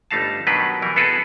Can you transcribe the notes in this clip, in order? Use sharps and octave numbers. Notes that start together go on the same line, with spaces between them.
G1 G3 A3 D#4 F5 A5
B2 D#3 F#3 D4 G4 B4
B2 E3 G3 A#4
B3 E4 F#4 G#4 A4 B4